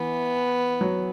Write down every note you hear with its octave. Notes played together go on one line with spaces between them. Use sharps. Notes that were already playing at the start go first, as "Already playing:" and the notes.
Already playing: E3 B3
F#3